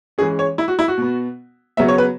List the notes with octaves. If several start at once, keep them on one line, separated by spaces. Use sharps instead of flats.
E3 G#3 C#4 G#4
C#5
E4
F#4
E4
F#4
B2 B3
C#3 F#3 B3 E5
C#5
B4